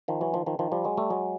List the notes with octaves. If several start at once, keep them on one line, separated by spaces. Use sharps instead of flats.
D#3 F3
E3 F#3
D#3 F3
D#3 F3
D#3 F3
F3 G3
F#3 G#3
G3 A3
F#3 G#3